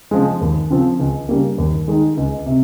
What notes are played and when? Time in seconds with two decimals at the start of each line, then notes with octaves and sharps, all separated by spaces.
0.11 C#3 F3 G#3
0.41 D#2
0.70 C#3 F3 C4 F4
0.99 C#2
1.29 C#3 G3 A#3
1.58 D#2
1.88 D#3 G#3
2.17 C#2
2.46 C3